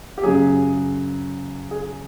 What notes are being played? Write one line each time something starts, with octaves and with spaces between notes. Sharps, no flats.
G4
F#2 C#3 F#3 G#4
G#4